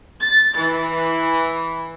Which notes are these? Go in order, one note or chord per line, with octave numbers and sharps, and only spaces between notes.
A6
E3